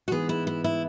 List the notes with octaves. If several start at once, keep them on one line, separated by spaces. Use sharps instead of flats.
F#4
G#2 E3 B3 G#4
E4
E4
E4